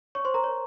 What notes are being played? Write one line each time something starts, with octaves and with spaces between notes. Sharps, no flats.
C#5 C#6
C5 C6
A#4 A#5
C#5